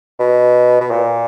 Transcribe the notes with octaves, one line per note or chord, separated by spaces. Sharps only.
B2
B2
A#2